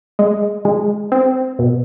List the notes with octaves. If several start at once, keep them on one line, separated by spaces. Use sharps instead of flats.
G#3
G#3
C4
B2